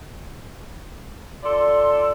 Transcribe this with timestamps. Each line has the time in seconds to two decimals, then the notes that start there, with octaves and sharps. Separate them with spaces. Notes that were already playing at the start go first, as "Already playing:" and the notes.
1.43 F4 A4 D5 C6